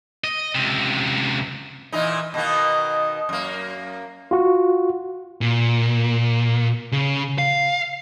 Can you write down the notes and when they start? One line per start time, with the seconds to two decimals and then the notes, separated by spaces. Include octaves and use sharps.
0.24 D#5
0.55 C#2 C3
1.92 A#2 E3 D#4
2.34 B2 D#3 A#3
3.29 F#2 A#3
4.31 F4 F#4
5.41 A#2
6.92 C#3
7.38 F5